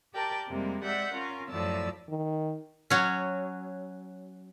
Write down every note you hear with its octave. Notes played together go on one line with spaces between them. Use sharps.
G4 A#4 D5 G5 A5
F2 C3 G3 G#3 A#3
G#3 D5 E5 F#5 G6
C#4 F4 A#4
F#2 A2 F3 D5 A5 E6
D#3
F#3 C#4